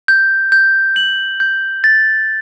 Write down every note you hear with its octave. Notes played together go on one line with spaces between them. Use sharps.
G6
G6
F#7
G6
A6